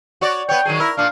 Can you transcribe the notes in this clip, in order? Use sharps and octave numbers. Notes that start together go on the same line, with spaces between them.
F#4 C#5 D5
B3 C#5 G5
D#3 F#3 G#4
E4 A#4
A#2 D4 F5